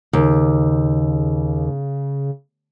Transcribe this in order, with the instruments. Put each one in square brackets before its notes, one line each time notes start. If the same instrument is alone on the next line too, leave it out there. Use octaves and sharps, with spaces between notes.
[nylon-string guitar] D#2 [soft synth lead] C#3